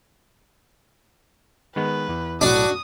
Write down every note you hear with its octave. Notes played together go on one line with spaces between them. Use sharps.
D#3 G#3 B3 B4
E2
B1 A2 D4 F#4 D#6